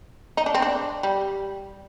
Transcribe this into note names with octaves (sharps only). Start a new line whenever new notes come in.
D#4
D4
C4
D4
G3